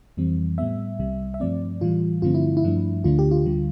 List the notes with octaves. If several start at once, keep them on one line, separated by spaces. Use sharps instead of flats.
F2 E3 G3 C4
A2 G3 B3 E5
C2 C3 G3
E5
G2 F3 A3 C4 D5
A2 E3 G3 F4
G2 D3 F3 A3 C4 F4
E4
E4
G2 F3 A3 D4
D2 D3 A3 D4 F4
G4
F4
D2 D3 G3